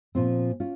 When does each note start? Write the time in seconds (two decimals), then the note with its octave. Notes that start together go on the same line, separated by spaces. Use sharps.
0.15 A#2 F3 C4
0.60 C#4 F4